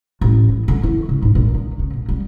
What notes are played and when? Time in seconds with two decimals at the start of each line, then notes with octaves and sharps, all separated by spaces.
0.21 A1
0.49 E3
0.68 D3
0.83 E4
1.09 C#3
1.22 G#2
1.35 A#1
1.54 D#3
1.79 C#3
1.94 A#1
2.09 G3